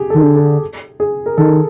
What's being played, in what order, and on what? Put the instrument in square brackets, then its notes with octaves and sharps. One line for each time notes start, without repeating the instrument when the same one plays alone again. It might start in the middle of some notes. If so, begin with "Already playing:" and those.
Already playing: [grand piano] G4 G#4
[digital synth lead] D#3 [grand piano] A4
[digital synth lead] D3
[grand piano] A4
G#4
A#4
[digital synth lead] D#3 [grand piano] A4